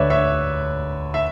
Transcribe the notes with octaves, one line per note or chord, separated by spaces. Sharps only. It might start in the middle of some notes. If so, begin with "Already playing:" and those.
Already playing: D2 D3 B4 C#5 D5 E5
C#5 E5
E5